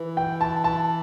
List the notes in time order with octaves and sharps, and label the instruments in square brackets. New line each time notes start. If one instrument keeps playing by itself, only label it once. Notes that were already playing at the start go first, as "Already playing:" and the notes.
Already playing: [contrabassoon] E3
[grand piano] G5
A5
A5